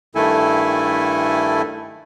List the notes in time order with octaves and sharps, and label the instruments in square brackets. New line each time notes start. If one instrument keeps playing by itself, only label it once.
[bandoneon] G2 D#3 A3 E4 A4 G#5